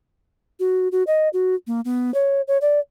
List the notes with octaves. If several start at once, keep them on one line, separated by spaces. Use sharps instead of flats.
F#4
F#4
D#5
F#4
A#3
B3
C#5
C#5
D5